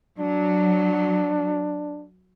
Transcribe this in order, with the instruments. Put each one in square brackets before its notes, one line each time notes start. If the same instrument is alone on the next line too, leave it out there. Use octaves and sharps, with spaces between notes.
[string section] F#3 [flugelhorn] D4